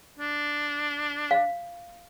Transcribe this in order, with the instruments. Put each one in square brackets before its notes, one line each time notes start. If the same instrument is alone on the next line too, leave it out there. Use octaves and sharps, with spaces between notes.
[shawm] D4
[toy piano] F5